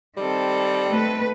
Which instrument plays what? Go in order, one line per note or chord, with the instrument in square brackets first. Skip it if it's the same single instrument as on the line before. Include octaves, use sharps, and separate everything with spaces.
[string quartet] D#3 C4 A4 [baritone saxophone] G3
[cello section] A3 B4